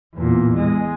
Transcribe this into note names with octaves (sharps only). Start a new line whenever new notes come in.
E2 A#2
G#3